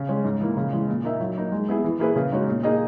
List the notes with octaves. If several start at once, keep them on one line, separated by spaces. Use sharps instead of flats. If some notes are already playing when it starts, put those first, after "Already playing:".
Already playing: C#3
G#3 C#4
G#2
E3 A#3
C#3
E3 G#3
A#2
A#3 D#4 A#4 E5
F#3
A#3 D#4 A#4
G#3
B3 E4 G#4
E3
A#3 E4 G#4 B4
C#3
G#3 D#4 F#4 C#5
A#2
A#3 D#4 G#4 D#5